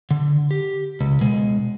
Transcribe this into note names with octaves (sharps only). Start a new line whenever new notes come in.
D3
G4
C#2
B2 G#3